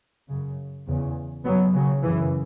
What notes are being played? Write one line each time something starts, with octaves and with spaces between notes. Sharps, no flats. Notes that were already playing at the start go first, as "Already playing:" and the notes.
F#2 C#3
E2 C#3
F#2 C#3 F#3 B3
C#3 F#3
F#2 C#3 E3